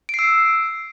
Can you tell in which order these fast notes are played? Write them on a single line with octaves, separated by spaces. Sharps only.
D7 C7 E6